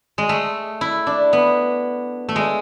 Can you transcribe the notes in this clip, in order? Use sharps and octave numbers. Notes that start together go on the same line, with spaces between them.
G#3
A3
E4
D4
B3
A3
G#3